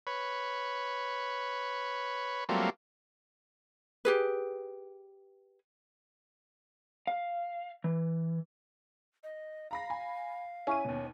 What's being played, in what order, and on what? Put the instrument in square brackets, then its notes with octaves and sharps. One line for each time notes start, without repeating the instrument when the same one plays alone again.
[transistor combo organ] B4 C#5
F#3 G3 A3 A#3 C4 F4
[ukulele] G4 G#4 B4
[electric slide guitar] F5
E3
[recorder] D#5
[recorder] F5 [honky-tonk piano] A#5 B5 A#6
[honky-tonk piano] G#5 B5
[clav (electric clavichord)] C#4 [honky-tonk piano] E4 D#7
[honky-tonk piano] D#2 B2